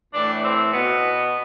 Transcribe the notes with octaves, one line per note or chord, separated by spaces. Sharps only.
A2 E3 D4
C4
B2 B3